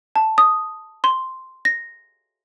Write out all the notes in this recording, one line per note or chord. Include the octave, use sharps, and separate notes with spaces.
A5
D#6
C6
A#6